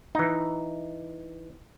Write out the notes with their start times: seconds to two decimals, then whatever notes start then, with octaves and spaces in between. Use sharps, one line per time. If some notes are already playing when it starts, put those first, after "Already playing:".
0.15 E3 D#4